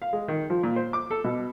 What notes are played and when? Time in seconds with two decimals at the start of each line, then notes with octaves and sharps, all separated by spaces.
0.02 F5
0.13 G#3
0.28 D#3
0.50 F3
0.63 A#2
0.76 C5
0.93 D6
1.11 A4
1.24 B2